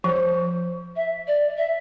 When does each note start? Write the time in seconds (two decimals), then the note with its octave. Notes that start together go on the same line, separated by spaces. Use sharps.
0.04 F3 C5
0.96 E5
1.27 D5
1.58 E5